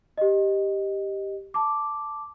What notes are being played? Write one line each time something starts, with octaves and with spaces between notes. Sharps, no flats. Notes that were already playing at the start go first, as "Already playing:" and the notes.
G4 D#5
A5 D6